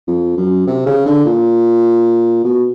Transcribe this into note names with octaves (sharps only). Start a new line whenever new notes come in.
F2
F#2
C3
C#3
D3
A#2
B2